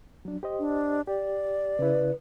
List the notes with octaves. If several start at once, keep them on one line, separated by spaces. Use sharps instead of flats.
F#3 D4
G4 C5 D#5
D4
G4 D5
C#3 E4 B4